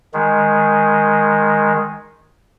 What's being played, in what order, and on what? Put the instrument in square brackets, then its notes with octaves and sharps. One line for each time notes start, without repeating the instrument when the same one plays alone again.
[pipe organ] D#3 G#3